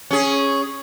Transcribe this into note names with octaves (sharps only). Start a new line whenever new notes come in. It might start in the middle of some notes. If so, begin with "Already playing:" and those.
C#4 G#4